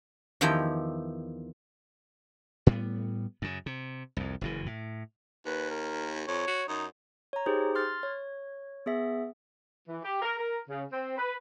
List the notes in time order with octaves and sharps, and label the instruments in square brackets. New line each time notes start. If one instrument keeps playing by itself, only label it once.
[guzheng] E2 D#3 F3 E4 G4 G5
[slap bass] A2 G3 B3
F#2 C#3
C3
C2 F2
F#1 F#2 E3
A2
[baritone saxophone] D#2 [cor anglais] B4
[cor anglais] A#4
[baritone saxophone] F2 [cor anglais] C#5
[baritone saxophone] F#4
[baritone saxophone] F#2 [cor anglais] D#4
[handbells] C#5 A#5
D#4 G4 G#4 C5
C6 F6 A6
C#5
B3 G#4 E5
[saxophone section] E3
G4
A#4
A#4
C#3
C4
B4